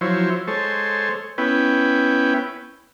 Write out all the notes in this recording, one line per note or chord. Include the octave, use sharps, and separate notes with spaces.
F3 F#3 E4 C5 C#5
G#3 A4 C5 C#5
B3 C#4 E4 B4 G5